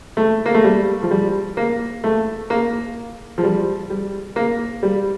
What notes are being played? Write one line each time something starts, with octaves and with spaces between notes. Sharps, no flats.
A3
A#3
A3
G3
F3
G3
A#3
A3
A#3
F3
G3
G3
A#3
G3